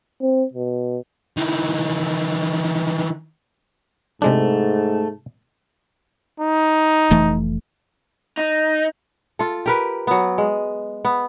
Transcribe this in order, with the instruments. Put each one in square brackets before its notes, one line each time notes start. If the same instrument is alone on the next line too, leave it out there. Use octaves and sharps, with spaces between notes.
[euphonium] C4
B2
[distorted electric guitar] D#3 E3
[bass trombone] G#2 [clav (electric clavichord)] C3 G#3 D4 [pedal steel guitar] A3
[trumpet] D#4
[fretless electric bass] F1 E3 A3
[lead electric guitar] D#4
[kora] F4 A4
G4 A#4 B4
F#3 B3
G#3
B3